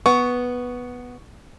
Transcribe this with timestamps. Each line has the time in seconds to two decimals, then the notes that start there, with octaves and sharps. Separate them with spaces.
0.06 B3 C#6